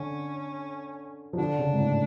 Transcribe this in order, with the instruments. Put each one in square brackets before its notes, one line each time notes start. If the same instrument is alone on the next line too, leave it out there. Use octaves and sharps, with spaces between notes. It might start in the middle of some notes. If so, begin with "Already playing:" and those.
Already playing: [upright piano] D3 [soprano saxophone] C#4
[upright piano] F3
[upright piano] D3 [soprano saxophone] D4
[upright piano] C#3
G#2
A2